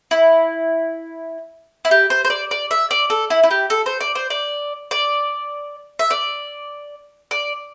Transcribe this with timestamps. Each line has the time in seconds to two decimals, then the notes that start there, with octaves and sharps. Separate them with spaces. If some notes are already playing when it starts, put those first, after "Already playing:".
0.11 E4
1.85 E4
1.91 G4
2.10 C5
2.25 C5
2.30 D5
2.51 D5
2.71 E5
2.91 D5
3.10 A4
3.30 E4
3.43 E4
3.51 G4
3.70 A4
3.86 C5
4.00 D5
4.15 C5
4.30 D5
4.91 D5
5.99 E5
6.11 D5
7.31 D5